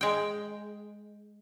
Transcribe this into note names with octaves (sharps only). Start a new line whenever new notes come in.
G#3 G5